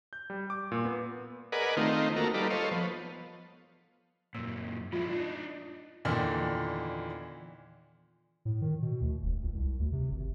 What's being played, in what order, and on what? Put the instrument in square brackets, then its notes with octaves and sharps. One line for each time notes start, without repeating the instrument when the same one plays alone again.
[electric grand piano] G6
G3
D6
A#2
B3
[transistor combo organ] G#4 A#4 B4 D5 D#5 F#5
D#3 A3 C4 D#4 F4
A#3 F#4 A4 A#4
G3 D#4 F4 A4 B4 D5
A4 C5 C#5 D#5 F5
F3 B3
[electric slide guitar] F#2 A#2 [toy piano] A#4
[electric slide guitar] F3 G#3 E4 [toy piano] F4
[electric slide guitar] D4 D#4
[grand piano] E2 A#2 D3 D#3
[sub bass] A2
D#3
B2
D2
E1
C#2
C2
D2
C3
G#1